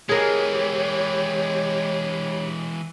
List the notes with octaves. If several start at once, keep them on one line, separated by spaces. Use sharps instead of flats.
E3 G#3 G4 G#4 A#4 C#5